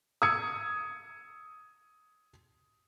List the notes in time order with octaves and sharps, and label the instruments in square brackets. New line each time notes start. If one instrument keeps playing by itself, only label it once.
[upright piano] D#6 E6 G#6 C#7